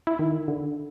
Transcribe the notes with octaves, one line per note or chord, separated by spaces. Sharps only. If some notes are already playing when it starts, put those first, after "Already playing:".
E4
D#3
D3